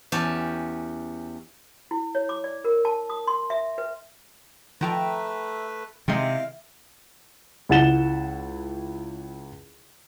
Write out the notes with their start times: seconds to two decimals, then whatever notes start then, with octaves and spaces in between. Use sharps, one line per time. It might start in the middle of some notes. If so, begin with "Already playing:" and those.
0.12 E2 C#4 G4 A5
1.91 E4
2.15 C#5
2.29 D6
2.44 D5
2.65 A#4
2.85 A5
3.10 D#6
3.27 C6
3.50 E5
3.78 B4
4.81 D#3 F3 A3 B4 E5 G5 A#5
6.08 C3 D#3 G#3 E4 D#5 F5
7.69 C#2 E4 F#5 A6 E7 G7